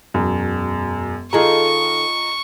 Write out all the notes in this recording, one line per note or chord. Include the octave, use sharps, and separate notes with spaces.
E1 F#2
D#3 F4 G#4 A4 D#5 A#5 C#6